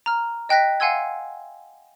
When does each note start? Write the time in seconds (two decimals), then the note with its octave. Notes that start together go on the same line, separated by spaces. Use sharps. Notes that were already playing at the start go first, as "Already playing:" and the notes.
0.06 A#5 F6
0.49 D#5 G5 F#6 A#6 B6
0.80 F5 F#5 G#5 C6 E6 G#6